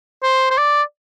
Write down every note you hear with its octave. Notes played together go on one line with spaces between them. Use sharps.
C5
C5
D5